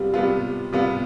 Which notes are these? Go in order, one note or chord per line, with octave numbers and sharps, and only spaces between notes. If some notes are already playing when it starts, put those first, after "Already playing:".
Already playing: C3 G3 B3 F4
C3 G3 B3 F4
C3 G3 B3 F4